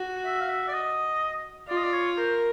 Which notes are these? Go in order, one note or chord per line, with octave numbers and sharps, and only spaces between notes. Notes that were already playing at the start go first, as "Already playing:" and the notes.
Already playing: F#4
E5
F5
E5
D5
D#5
F4 D5
D#5
D5
C#5
A#4 C5